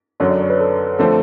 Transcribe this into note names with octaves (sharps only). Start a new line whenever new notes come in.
F#2 D3 F#3 C#5
D5
C#5
B4
A4
D3 F3 A3 C4 A4